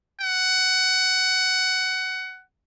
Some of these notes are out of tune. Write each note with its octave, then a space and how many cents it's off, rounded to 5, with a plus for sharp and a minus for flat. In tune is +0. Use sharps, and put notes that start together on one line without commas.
F#5 +15